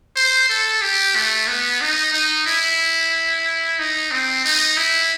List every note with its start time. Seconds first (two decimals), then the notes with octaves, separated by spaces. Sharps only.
0.16 C5
0.49 A4
0.82 G4
1.16 A3
1.48 B3
1.81 D#4
2.14 D#4
2.47 E4
3.79 D#4
4.11 C4
4.45 D#4
4.77 E4